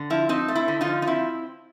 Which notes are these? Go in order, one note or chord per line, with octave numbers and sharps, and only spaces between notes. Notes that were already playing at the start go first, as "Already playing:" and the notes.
Already playing: D3
F3 E4
C4 D#4
A3
E4
D3
D#4 F4
F3
D#4
C4 E4